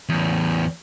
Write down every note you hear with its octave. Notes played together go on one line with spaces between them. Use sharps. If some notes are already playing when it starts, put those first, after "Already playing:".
E2 A2